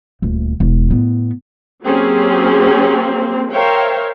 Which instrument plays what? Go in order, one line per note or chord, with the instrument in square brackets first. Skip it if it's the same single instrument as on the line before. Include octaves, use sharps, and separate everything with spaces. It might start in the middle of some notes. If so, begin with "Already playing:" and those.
[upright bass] D#1 D2
E1
A2 B3
[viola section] F#3 A#3 C4 C#4 G4 G#4
A#4 C5 C#5 E5 F5 G5